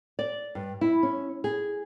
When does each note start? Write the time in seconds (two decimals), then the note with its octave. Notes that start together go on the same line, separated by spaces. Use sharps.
0.19 D5
0.55 G2
0.81 E4
1.03 C#4
1.44 G#4